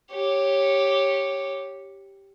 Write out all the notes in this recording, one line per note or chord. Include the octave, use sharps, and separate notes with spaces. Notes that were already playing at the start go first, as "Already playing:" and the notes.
G4 C#5